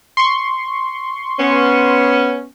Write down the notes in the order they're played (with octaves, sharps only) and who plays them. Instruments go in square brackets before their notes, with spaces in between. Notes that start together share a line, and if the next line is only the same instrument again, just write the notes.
[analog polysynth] C6 C#6
[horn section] B3 C#4